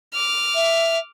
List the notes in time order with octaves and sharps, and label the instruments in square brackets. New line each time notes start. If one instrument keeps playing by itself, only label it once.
[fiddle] D6 F6
[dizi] E5